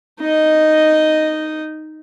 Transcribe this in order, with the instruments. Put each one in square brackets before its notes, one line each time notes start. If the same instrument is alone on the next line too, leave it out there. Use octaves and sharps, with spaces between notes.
[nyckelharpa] D#4 D#5